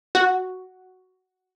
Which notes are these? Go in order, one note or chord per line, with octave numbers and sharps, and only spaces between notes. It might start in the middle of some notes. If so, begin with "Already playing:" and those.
F#4